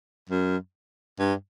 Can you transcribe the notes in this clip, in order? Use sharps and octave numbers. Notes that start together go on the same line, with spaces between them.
F#2
G2